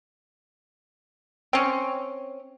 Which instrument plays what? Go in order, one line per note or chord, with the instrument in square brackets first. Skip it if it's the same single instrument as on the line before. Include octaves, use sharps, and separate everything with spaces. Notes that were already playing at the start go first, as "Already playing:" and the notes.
[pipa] C4 C#4